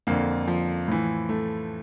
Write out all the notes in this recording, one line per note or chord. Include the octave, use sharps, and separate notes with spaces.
F2 D3 A#3
F3
A2 E3
A3